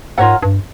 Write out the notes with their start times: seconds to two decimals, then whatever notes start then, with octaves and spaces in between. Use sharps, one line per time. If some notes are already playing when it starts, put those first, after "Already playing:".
0.18 G#2 F4 A#4 C#5 F#5
0.42 G2